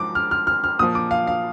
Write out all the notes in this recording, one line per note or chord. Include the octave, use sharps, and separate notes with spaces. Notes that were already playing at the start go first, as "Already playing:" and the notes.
Already playing: G#2 F3 D6
F6
F6
F6
F6
A#2 F3 D#6
D6
F5
F5